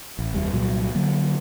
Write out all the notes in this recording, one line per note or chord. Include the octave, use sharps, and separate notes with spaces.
A1
F1 D#2 G3
C2 A#2 F#3 G3
D3 F#3 A#3